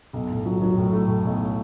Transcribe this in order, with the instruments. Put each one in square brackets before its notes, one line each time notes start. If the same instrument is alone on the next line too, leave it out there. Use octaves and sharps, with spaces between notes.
[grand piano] B1
A2
F#3
F#3
A2
A3
A2
B1